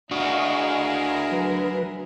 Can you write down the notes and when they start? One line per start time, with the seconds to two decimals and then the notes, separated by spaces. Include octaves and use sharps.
0.11 D4 E4 F#4 G#4 A#4 D#5 F5 C#6
1.32 F#3 B4